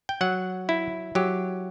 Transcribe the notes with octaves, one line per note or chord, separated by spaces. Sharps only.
G5
F#3 F#5
E4
F#3 G4